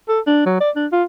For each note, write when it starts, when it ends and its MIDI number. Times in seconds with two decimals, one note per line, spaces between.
0.09 0.20 69
0.27 0.41 62
0.46 0.57 54
0.60 0.70 74
0.76 0.87 62
0.92 1.03 65